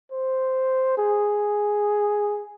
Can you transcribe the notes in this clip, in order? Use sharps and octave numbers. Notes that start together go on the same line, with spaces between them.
C5
G#4